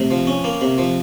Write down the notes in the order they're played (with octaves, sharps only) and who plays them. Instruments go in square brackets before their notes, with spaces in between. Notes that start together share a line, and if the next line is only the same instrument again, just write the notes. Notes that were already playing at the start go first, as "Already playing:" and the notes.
Already playing: [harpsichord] C3 [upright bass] A3
[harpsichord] F3
C#4
A#3
C3
F3